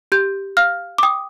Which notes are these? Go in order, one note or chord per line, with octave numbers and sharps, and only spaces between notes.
G4 G6
F5 F6
D6
G5 D#6